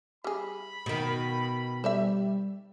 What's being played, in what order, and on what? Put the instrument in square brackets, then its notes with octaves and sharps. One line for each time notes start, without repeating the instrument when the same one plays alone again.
[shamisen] G3 G#4 [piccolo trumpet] B5
[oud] B2 D#3
[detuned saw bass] G3 [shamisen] C5 D5 E5